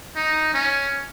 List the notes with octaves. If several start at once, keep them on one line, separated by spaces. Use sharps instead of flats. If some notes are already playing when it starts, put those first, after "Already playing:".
D#4
C#4